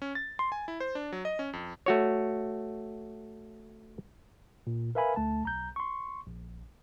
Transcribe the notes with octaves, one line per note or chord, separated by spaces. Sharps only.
C#4
A6
C6
G#5
E4
C5
D4
F#3
D#5
C#4
F2
A3 F#4 C#5
A#2
A#4 B4 E5 F5 G#5 B5
D2 A3 A5
B1 A#5 G6
C6 C#6
A#1